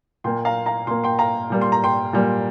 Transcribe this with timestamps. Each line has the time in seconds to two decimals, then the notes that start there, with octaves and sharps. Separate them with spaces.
0.24 A#2 A#3 G5 C6
0.45 F5 A#5
0.66 F5 A#5
0.87 A#2 A#3 C6
1.04 G5 C6
1.19 F5 A#5
1.50 A#2 G3 A#3
1.61 C6
1.72 A#5
1.84 G5 C6
2.13 A#2 G3 A#3